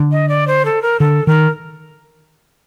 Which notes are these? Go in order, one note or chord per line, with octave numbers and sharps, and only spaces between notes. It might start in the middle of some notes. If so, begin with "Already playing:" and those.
Already playing: D3
D#5
D5
C5
A4
A#4
D3 A4
D#3 A#4